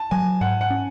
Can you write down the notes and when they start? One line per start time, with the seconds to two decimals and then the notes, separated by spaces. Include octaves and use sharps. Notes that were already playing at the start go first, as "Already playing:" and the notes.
Already playing: A5
0.11 F#3 G#5
0.41 G#2 F#5
0.61 F#5
0.70 C#4